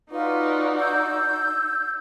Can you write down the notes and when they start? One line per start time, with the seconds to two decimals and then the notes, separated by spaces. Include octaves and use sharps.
0.11 D#4 F4 F#4 B4 D5
0.79 E6 G6